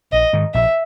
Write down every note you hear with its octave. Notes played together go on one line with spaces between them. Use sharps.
A#1 D#5
G#2 D#3
A#1 E5